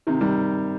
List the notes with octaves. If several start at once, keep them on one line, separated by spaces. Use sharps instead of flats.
C3 D#3
D#3 G3